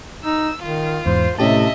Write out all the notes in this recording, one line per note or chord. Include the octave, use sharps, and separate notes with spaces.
D#4 E6
D#3 F4
E2 G#2 C5
A2 C3 C#4 G4 D#5 E5 A5